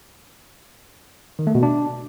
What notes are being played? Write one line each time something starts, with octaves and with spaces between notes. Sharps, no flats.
D#3
A3
B2
D4